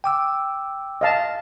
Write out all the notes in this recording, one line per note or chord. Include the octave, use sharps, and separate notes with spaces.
G5 D6 E6
D#5 F5 A5